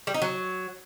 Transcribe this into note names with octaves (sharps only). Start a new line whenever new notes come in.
G3
D#4
F#3